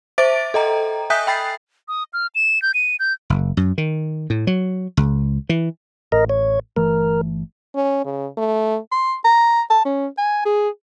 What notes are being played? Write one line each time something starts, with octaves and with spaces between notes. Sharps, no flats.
C5 E5 D6 A6 D7
A4 D#5 G5 A#5
E5 G#5 D#6 F#6 G6 B6
G5 B5 A6 C7
D#6
F6
E7
G6
D#7
G6
F#1
F#2
D#3
A2
F#3
C#2
E3
A1 A#4 D#5
C#5
G1 E3 A3 A#4
C#4
C#3
A3
C6
A#5
A5
C#4
G#5
G#4